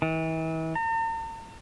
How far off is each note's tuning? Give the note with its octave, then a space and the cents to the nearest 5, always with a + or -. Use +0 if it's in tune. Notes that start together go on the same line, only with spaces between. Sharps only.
E3 -40
A#5 -45